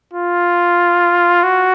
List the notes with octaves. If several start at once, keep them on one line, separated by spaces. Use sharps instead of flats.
F4
F#4